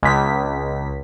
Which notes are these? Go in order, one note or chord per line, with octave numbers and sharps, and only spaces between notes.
C#2 B6